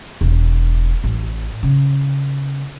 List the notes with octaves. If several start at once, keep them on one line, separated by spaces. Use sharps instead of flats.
E1
A1
C#3